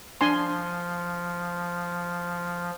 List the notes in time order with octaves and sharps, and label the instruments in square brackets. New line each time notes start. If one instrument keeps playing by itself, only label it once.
[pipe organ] F3 [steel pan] D4 G#5 C6